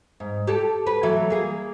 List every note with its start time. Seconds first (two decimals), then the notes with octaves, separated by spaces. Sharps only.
0.20 G#2
0.47 G4 A4
0.87 B4
1.03 E3 F#3 A3
1.30 A#3 G#4